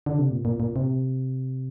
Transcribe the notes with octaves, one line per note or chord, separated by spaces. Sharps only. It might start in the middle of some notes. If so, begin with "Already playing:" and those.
D3
C3
A#2
A#2
A#2
C3